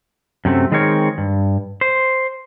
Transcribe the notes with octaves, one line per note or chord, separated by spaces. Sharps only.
F#2 C3 A3 C4
D#3 G#3 C4 A#4 C#5
G2
C5